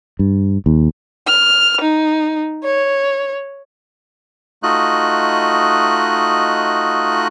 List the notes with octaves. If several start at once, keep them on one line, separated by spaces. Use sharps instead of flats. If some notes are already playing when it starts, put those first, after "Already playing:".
G2
D#2
F6
D#4
C#5
A3 D#4 F4 F#4 D#5 F#6